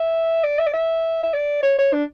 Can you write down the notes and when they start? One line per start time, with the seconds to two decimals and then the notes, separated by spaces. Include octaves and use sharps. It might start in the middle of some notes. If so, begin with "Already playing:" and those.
Already playing: E5
0.44 D5
0.59 E5
0.66 D5
0.73 E5
1.23 E5
1.34 D5
1.63 C#5
1.79 C#5
1.93 D4